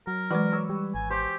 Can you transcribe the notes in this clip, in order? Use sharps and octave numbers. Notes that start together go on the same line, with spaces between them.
F#3 A#4
E3 G#3 F#4 B4 D5
C#5 E6
G3
G#1 G#5
G4 C5 G#5